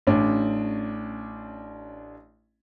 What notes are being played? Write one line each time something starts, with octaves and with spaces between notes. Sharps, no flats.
A1 C#4 D4 D5